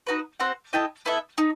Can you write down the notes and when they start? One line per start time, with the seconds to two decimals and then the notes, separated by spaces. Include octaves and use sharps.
0.07 D#4 F#4 B4
0.40 C4 F#4 C5 F#5
0.73 E4 A4 D#5 G5
1.05 B3 E4 A4 E5
1.38 D#4